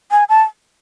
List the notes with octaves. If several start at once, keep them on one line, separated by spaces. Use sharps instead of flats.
G#5
A5